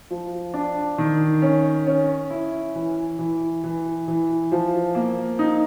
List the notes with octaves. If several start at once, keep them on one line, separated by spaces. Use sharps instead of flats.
F3
D4
D#3
C#4
C#4
E4
E3
E3
E3
E3
F3
A#3
D#4